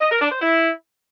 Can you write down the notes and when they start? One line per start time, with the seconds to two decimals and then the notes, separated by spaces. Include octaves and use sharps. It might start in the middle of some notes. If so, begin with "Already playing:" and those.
0.01 D#5
0.11 A#4
0.21 D4
0.31 C5
0.41 E4